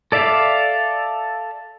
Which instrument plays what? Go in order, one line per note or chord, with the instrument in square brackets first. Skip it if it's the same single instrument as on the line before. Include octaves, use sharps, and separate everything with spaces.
[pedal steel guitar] A4 D5 E5 F5